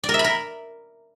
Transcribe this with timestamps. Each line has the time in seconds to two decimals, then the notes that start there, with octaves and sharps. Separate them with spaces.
0.04 D5
0.09 A#4
0.14 E5
0.19 B5
0.24 A#4